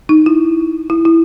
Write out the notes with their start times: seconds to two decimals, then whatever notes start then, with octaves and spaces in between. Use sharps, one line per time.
0.09 D#4
0.26 E4
0.90 E4
1.05 E4